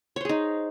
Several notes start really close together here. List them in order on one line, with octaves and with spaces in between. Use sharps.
C#5 C5 G#4 D#4